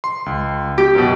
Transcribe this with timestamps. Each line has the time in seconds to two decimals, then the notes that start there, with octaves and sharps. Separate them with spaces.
0.04 C6
0.26 C#2
0.78 G4
0.95 F#2 B2